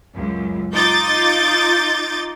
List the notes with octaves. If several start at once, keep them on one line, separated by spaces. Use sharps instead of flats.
C#2 F#2
D#4 F4 D6 G6 A6